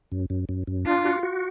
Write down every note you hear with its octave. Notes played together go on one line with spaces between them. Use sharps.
F#2
F#2
F#2
F#2
D4 F4
F#4
F#4